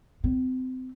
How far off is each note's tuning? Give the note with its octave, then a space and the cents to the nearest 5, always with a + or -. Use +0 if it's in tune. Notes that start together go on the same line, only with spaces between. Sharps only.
C4 -30